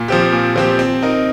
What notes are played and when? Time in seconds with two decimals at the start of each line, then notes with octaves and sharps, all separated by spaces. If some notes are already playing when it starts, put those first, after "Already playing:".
Already playing: A#2
0.08 F3 C4 G4
0.32 A#2
0.56 F3 C4 G4
0.79 C4
1.03 D#4 A#4